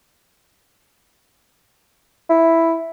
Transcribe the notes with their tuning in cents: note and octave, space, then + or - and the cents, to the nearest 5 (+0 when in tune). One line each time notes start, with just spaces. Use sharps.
E4 +0